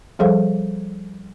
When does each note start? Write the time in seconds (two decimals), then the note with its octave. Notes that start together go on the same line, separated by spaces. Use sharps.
0.19 F3 G3 G#4 A4 C5 F5